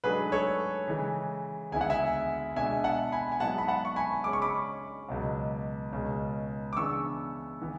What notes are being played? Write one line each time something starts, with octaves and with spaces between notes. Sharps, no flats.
G#2 F#3 A3 D4 G#4 B4
A4 C#5
C#3 E3 G#3
D2 C#3 G#3 B3 E4 G#5
F#5
E5 G#5
B2 G#3 B3 D4 E5 G#5
F#5 A5
G#5 B5
G#5
G#2 F#3 B3 E4 F#5 A5
B5
F#5 A5
C#6
G#5 B5
C#3 G#3 C#4 D6
C#6
B5 D6
C#2 B2 F#3
C#2 B2 G#3 C#4
D6
C#3 E3 B3 D4 C#6 E6
E3 B3